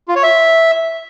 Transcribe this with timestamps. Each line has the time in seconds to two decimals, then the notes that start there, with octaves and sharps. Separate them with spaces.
0.08 F4
0.16 C#5
0.23 E5